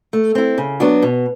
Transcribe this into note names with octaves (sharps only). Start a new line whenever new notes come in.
A3
C4 E4
C#3
F#3 B3 D4 F#4
B2